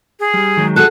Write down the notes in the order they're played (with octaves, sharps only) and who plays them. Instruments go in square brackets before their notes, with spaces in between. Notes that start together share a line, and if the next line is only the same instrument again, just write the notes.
[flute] G#4
[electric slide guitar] G3
D#3 F#3 G#3
[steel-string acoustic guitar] F#4 G#4 A4 [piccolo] F#6